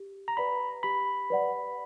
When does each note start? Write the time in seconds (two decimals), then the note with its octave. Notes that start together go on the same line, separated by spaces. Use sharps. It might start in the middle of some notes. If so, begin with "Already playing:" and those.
Already playing: G4
0.28 A#5
0.37 B4 D5 F#5 B5
0.83 G4 B5
1.30 B4 D5 F#5